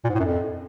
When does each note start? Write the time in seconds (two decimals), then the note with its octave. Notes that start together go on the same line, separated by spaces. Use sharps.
0.04 A#2
0.10 G#2
0.15 A2
0.20 F#2
0.25 F2